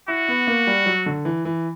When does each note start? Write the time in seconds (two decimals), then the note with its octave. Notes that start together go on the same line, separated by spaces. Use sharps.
0.08 E4 F#4
0.28 B3
0.47 A#3
0.67 G3
0.86 F#3
1.06 D3
1.25 E3
1.45 E3